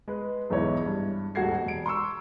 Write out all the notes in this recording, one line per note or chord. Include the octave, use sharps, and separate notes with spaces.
G#3 B4
B1 E2 G#2 E4 C#5
G2
D#1 G#2 F#4 A4 G#6 C7
E1 D7
C6 C#6 E6